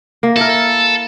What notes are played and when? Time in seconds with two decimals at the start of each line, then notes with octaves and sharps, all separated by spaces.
0.23 A#3
0.36 E4 A4 A#4